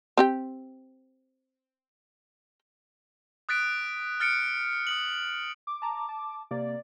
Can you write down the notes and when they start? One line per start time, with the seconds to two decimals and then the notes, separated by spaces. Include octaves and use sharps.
0.17 C4 G4 G5
3.49 D#6 F#6 A6 B6 D7
4.20 F6 A6 C#7 D7
4.87 D#6 C#7 F#7
5.67 D6
5.82 A5 A#5
6.09 A5
6.51 C3 A#3 D5